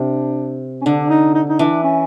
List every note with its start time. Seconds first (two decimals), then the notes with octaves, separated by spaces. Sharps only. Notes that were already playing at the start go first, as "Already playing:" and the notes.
Already playing: C3 D4
0.81 C#4
0.86 D3 D4
1.10 D#4
1.35 D#4
1.49 D#4
1.59 E3 D4
1.83 C#4